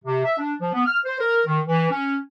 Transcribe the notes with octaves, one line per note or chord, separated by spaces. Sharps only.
C3
E5
D4
F3
B3
F6
C5
A#4
D#3
E3
C#4